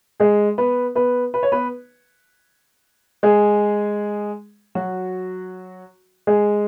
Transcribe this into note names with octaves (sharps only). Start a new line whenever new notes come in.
G#3 G#4
B3 B4
B3 B4
B4
C#5
B3 B4
G#3 G#4
F#3 F#4
G#3 G#4